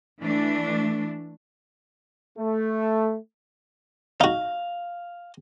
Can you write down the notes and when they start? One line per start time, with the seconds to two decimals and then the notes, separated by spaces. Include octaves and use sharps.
0.21 E3 A3 D4
2.38 A3
4.21 D#4 F#4 F5